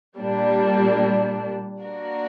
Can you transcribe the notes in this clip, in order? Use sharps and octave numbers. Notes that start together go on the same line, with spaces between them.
A#2 G3 A#3 D4
A#3 D4 F#4 A#4